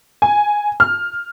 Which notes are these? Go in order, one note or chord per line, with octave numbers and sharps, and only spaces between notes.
G#5
F6